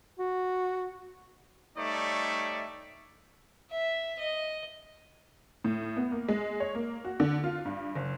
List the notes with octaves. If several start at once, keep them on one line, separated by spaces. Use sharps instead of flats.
F#4
G3 A3 D#4 C#5 D5 E5
E5
D#5
A2
B3
A#3
G#3
C#5
A#3
F#4
D3
F4
G2
F#1